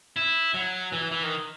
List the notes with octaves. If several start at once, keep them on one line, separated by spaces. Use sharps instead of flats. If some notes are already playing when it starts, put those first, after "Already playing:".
E4
F#3
E3
E3
D#3